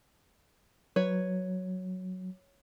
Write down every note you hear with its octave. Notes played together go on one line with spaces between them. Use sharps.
F#3 B4 C#5